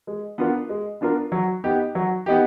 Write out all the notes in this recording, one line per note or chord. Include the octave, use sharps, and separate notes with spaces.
G#3
B3 D4 F4 A#4
G#3
B3 D4 F4 A#4
F#3
B3 D#4 G4
F#3
B3 D#4 G4